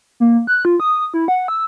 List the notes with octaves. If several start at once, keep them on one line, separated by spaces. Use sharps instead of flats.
A#3
F#6
F4
D#6
E4
F#5
E6